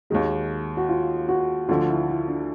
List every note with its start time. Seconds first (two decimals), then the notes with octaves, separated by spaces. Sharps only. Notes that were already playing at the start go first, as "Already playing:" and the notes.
0.10 D#2 D#3 G#3 F#4
0.77 F#4
0.89 F4
1.29 F#4
1.68 D2 D3 F3 F4
1.89 E4
2.09 E4
2.28 D4